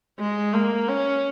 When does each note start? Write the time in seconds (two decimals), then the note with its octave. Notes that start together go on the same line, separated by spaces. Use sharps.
0.19 G#3
0.53 A#3
0.88 C#4